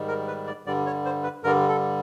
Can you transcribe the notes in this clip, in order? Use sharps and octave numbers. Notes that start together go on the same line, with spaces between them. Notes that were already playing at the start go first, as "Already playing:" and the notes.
Already playing: G#2 D#3 G3
A#4
B4
D5
G2 D3 G3 D5
C#5
C5
B4
G2 D3 G3 A#4
A4